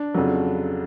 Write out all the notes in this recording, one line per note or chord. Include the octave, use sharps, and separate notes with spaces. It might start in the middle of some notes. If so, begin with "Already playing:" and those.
Already playing: D4
F2 C#3 F#3